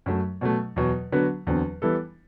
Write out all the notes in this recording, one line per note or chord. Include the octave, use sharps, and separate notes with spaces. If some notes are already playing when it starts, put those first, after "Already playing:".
F#2 F#3 A3
B2 F#3 A3
E2 B2 F#3
D3 F#3 B3 F#4 B4
E2 D3 F#3 C4
E3 G3 B3 E4 A4